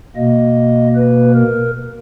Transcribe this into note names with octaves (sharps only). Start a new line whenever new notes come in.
B2 A#3 D#5
B4
A#4